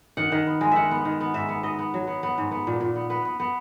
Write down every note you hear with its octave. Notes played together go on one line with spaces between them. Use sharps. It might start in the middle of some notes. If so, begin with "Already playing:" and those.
D#3 F#5
D#3
B3
G#3
D#3 E5 F#5
B3
D#3
B3
G#2 E5
B3
B3 D#5
B3
F#3
B3
B3
G#2
B3
A#2
A#2
B3
B3 B4
B3
B3